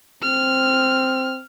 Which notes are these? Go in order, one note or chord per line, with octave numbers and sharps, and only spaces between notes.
C4 F6